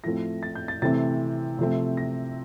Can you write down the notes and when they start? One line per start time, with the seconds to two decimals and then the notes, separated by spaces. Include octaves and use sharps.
0.04 A2 F3 A3 C4 A#6
0.43 A6
0.55 G6
0.68 A6
0.82 C3 E3 A3 C4 A6
1.59 C3 F3 A3 C4
1.97 A#6